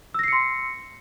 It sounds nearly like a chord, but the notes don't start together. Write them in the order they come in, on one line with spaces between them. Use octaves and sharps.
E6 A#6 C7 C#7 C6